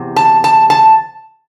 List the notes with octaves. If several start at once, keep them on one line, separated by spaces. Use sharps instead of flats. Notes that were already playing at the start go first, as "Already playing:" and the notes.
Already playing: E2 C3
A5
A5
A5